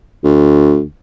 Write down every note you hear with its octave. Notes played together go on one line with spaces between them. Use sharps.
D2